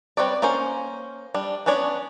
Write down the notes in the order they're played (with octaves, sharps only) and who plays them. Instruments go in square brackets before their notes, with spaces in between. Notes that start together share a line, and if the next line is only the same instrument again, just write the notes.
[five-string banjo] G3 C4 B4 C#5 D5
A#3 C#4 C5
G3 D4
B3 C#4 D4 C#5 D5